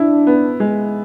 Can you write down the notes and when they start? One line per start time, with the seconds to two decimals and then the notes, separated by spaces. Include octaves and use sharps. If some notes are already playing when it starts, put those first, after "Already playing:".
Already playing: D4 E4
0.27 B3
0.60 G#3